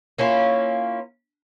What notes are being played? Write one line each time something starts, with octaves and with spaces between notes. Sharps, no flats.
A#3 C#4 E4 F4